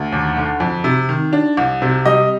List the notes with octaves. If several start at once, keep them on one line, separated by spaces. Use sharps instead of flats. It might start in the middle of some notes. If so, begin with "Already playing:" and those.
Already playing: D2
D#2
D3
F2
C3
D#3
D4
C2
C3
G3 D#5